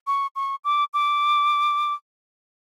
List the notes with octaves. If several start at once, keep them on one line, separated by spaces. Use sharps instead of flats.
C#6
C#6
D6
D6